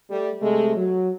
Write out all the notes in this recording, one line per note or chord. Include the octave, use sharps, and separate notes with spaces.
G3 A3
C3 G#3 A3
F#3